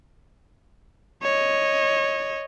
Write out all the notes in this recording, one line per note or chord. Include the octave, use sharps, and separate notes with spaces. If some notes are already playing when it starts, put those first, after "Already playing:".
C#5 D#5